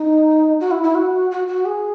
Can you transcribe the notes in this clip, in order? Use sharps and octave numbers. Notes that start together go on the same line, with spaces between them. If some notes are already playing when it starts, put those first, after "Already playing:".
Already playing: D#4
F#4
E4
E4
F#4
F#4
F#4
G#4